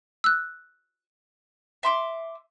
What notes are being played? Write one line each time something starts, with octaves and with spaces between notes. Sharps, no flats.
E6 F#6
E5 C6 D6